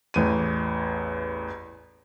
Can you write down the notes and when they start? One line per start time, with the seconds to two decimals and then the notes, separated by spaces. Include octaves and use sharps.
0.14 A1 E2 D#7